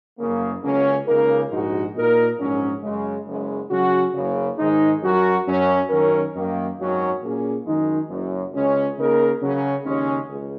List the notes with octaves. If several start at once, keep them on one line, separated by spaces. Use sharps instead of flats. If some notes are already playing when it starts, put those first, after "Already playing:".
F#1 F#2 C#3 A#3
C#2 C#3 F#3 A#3 C#4
C#2 C#3 A#3 D#4 A#4
A#1 G#2 G#3 D#4 F#4
A#2 A#3 D#4 A#4
A#1 G#2 F#3 C#4 G#4
F#2 C#3 G#3
F#1 F#2 C#3 G#3
C#3 F#3 C#4 F#4
F#1 F#2 C#3
G#2 D#3 G#3 D#4
F#2 F#3 C#4 F#4 A#4
F#2 F#3 C#4
F#2 D#3 F#3 C#4 A#4
F#2 D#3 A#3
G#1 F#2 D#3 F#3 C#4
A#2 A#3 C#4 G#4
F#2 D#3 G#3 D#4
F#1 F#2 F#3
C#2 C#3 G#3 C#4
C#3 A#3 D#4 A#4
C#3 F#3 C#4
D#2 C#3 G#3 C#4
C#2